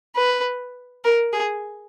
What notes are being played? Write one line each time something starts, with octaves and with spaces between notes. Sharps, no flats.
B4
A#4
G#4